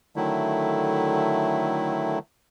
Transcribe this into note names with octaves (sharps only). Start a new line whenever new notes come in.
D3 D#3 F#3 A3 E4